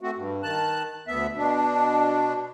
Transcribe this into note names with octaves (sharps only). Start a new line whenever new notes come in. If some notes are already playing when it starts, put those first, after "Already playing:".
A3 C4 F#4
G2
D#3 A5 F#6
D2 B3 E5
B2 D4